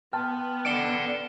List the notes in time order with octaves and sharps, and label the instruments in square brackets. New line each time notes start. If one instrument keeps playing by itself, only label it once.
[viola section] B3 [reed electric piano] G5 A5 C6 [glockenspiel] F6
[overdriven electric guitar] D5 F#5 [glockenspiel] E7 G7